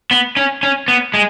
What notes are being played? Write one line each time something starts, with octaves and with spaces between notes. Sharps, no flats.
B3
C#4
C#4
B3
G#3